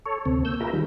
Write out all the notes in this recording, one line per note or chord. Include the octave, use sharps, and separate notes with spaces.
A4 C#5
D2 C3 C4
A#3 E6 G6
F4 G#4 A#4 B4 E5 A#5
D#3 G3